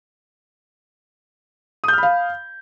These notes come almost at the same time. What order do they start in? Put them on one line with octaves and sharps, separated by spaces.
D#6 G6 F6 B5 F5